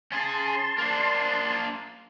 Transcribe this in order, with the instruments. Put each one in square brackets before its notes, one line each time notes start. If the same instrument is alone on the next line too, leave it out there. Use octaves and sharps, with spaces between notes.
[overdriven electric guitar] C#4 G#4 [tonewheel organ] A5 C6
[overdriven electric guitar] A#3 D4